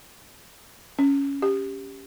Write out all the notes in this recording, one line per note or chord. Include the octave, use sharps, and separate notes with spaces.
C#4
G4